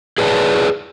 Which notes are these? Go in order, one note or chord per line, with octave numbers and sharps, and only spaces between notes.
G#4 B4 C#5 D5 A5